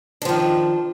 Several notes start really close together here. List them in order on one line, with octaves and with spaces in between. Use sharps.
D4 F3 D#3